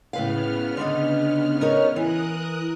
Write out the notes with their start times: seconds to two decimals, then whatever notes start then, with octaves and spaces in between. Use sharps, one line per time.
0.13 A2 C#3 B3 B4 F5 F6
0.77 D3 D4 D#4
1.61 D#4 A#4 C#5
1.96 E3 A#4 D#6 F#6